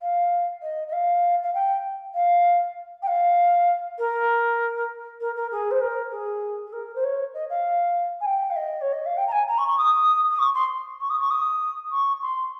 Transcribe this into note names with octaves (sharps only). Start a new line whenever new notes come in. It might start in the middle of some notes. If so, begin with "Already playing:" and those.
F5
D#5
D#5
F5
F5
G5
F5
G5
F5
A#4
A#4
A#4
G#4
C5
A#4
G#4
G#4
A#4
C5
C#5
D#5
F5
G#5
G5
F5
D#5
C#5
D#5
F5
G5
A#5
G#5
A#5
C#6
C#6
D#6
D#6
C#6
C6
C#6
D#6
C#6
D#6
C#6
C6